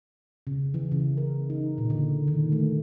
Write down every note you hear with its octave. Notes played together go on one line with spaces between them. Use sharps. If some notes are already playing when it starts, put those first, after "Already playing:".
C#3
E3
C#3
A#4
D#4
A#2
D3
D#3
A3